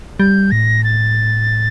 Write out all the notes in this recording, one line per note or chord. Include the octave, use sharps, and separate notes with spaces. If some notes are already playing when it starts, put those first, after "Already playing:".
G3 G6
A2 A#6
A6